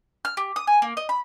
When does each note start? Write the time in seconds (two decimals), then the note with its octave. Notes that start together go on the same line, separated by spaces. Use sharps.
0.25 F6
0.37 G4
0.56 D#6
0.67 G#5
0.82 A#3
0.97 D#5
1.09 B5